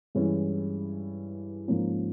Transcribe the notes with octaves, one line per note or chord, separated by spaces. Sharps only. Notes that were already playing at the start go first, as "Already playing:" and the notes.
G2 E3 G#3 C#4 E4
G#2 F3 A#3 C#4